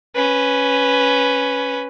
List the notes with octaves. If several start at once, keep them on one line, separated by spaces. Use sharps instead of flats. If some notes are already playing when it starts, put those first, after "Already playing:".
C#4 B4